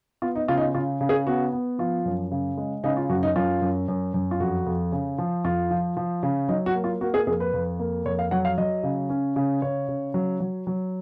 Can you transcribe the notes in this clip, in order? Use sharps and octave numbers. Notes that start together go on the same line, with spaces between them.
B3 F4
D#4
C#3 F4
D#4
F4
C#3 F4
C#3
G#4
B3 F#4
B3
F3 F4
F#2
C#3
G#3
C#3 D#4
F4
F#2 F#4
D#4
F#2 F4
F#2
F#2
F#2
F4
F2 F#4
F2
C#3
F3
F2 F4
F3
F3
C#3
F#3 D#4
F#4
A#3
F4
A#3 F#4
G#4
F2 G#4
B4
F2
A#3
F2 C#5
F5
F#3 F#5
F5
F#3 D#5
C#3
C#4
C#3
C#3 C#5
C#3
F#3
F#3
F#3